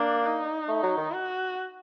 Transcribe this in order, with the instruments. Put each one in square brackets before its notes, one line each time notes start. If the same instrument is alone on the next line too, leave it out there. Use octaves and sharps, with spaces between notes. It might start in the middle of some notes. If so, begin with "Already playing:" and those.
Already playing: [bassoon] A#3 [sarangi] D4
[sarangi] D#4
[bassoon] A3
F#3
D#3
[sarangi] F#4